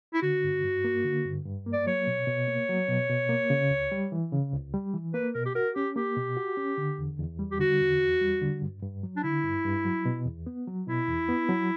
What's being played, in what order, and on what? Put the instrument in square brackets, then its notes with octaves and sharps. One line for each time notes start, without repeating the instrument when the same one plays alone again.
[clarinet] E4
[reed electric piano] D3 [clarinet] F#4
[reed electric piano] G2
G2
A#3
D3
G2
G2
A#3
[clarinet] D5
[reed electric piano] F#3 [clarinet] C#5
[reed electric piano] B2
B2
A#3
F#3
B2
B2
A#3
C#3
C#2
G3
E3
C#3
C#2
G3
E3
[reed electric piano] A#3 [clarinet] B4
[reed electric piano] B2 [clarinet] A#4
[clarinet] G4
[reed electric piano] F#4 [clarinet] A#4
[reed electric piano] C#4 [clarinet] G4
[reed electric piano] A#3 [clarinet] G4
[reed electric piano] B2
F#4
C#4
D3
E2
E2
G3
[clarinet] G4
[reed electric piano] D3 [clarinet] F#4
[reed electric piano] E2
E2
G3
D3
G2
G2
F#3
[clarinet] D4
[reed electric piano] D3 [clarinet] E4
[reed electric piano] G2
G2
F#3
B2
E2
B3
F#3
[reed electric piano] B2 [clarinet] E4
[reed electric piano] E2
B3
F#3